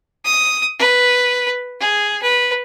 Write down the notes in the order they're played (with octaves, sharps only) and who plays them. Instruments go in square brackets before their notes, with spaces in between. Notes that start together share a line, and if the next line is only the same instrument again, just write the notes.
[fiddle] D#6
B4
G#4
B4